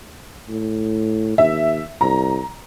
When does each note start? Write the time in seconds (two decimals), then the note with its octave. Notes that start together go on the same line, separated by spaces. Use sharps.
0.49 A2
1.38 D#2 E5
2.01 C2 A#5